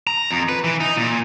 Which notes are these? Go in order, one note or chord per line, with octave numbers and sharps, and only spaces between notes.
A#5
F2
B4
E3
D#4
A#2